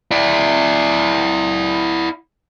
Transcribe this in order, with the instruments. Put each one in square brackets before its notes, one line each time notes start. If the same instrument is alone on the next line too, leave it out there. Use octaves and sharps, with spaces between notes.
[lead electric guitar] E4 D5